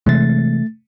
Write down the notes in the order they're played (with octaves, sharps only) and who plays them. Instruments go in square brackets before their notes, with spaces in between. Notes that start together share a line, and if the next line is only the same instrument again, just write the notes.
[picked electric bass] C3 E3 G#3 [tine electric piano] A3 A6